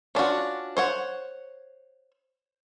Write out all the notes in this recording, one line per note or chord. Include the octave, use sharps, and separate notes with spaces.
C#4 D4 F4 F#4
C5 C#5 F#5